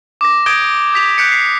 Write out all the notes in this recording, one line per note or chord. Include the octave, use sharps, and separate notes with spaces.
D6 A#6
D#6 G6 G#6 A#6 D7 G7
D#6 G6 B6 F7
F#6 G6 B6 C#7 D7
C7